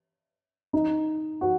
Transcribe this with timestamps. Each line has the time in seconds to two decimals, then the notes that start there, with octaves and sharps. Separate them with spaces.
0.73 D#4
1.41 F#4